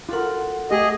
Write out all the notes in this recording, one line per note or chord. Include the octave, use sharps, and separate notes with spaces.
F4 F#4 A4 A#4 F#5
A3 G4 G#4 D#5